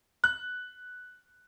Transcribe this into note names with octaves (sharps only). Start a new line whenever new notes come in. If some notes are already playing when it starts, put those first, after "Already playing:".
F#6